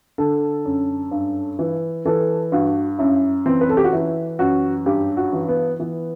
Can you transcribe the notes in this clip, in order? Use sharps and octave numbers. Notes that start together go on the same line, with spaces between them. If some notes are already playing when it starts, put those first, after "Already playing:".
D3 A4
F#2
G2
E3
E3 A4
G2 F#4
F#2 E4
E3 C4
B4
A4
G4
F#4
E3 E4
F#2 F#4
G2 G4
F#4
E3
B3
E3 B3